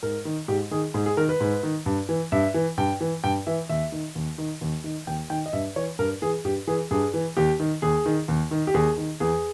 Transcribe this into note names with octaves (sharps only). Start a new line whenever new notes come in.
G#2 A#4
D#3
G#2 G4
D#3 G#4
G#2 G#4
G#4
D#3 A#4
B4
G#2
D#3
G2
E3
G2 E5
E3
G2 G5
E3
G2 G5
E3 E5
D#2 E5
D#3
D#2
D#3
D#2
D#3
D#2 G5
D#3 G5
D#5
G2 E5
E3 C#5
G2 A#4
E3 G#4
G2 G4
E3 G#4
G2 G#4
E3
D#2 G4
D#3
D#2 G#4
D#3
D#2
D#3
G4
D#2 G#4
D#3
E2 G#4